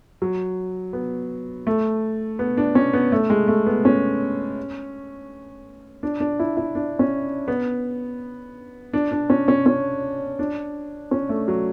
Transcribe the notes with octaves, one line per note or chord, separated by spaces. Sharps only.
F#3
B3
A3
B3
D4
C#4
B3
A3
G#3
A3
B3
C#4
D4
D4
E4
E4
D4
C#4
B3
D4
D4
C#4
C#4
C#4
D4
C#4
A3
F#3